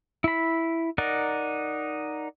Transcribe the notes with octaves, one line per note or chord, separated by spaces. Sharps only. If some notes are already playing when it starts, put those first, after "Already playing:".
E4 B5
D#4 A#4 D5 F#5